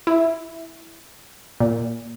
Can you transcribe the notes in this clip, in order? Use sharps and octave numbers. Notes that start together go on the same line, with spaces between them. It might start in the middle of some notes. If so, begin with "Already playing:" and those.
E4
A#2